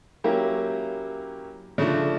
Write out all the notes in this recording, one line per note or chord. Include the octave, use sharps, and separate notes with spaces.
F#3 A#3 C#4 E4 G4
C#3 F3 A3 D4